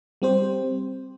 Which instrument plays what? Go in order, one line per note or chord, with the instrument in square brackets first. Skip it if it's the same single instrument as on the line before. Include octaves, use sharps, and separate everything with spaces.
[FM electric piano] G3 C4 G4 C5